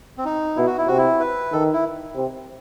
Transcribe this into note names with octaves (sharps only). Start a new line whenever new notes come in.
C4
D#4
B2 E4
F#4
E4
C3 F#4
E4
B4
D#3 A4
E4
C3